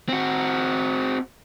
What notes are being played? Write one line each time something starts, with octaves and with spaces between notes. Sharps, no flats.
C4 F#4